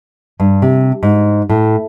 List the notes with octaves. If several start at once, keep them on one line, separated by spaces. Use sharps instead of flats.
G2
C3
G#2
A2